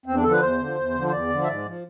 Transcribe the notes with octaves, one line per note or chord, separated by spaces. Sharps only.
E2 C4
D4
D3 F3 A4
B4
E2 C5
D3 F3
E2
D3 F3
C5
E2 D5
D3 F3
E5
G#2 D5
F3